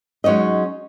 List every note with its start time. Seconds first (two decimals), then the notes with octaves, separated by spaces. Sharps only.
0.24 F#3 G#3 C#4 D#4 D#5